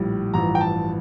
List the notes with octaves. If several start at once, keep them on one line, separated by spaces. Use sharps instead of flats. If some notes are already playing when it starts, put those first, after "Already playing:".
Already playing: A#1 A2 G3
A1 G2 F3 A#5
G5
A5